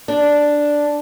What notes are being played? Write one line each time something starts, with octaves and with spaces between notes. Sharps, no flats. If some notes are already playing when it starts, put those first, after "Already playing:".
D4